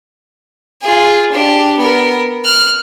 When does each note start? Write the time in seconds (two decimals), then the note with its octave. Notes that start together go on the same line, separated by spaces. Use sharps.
0.82 F4 G#4
1.32 D4 G4
1.78 B3 A#4
2.45 F6 F#6